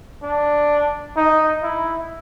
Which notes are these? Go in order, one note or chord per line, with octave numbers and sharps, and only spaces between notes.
D4
D#4
E4